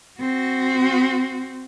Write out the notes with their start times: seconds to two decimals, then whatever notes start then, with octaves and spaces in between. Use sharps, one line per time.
0.20 C4 F#4